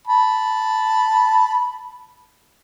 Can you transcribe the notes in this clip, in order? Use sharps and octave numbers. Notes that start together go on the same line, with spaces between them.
A5 B5